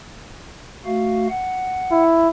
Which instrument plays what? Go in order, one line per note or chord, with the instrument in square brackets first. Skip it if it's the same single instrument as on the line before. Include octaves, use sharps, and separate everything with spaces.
[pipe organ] A3 F#4 F5
F#5
[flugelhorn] E4